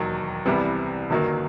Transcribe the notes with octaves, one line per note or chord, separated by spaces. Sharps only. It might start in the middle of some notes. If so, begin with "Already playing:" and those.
Already playing: E1 D#2 D#3 F#3
C2 C3 E3 G3 B3
G1 F#2 D#3 F#3 A#3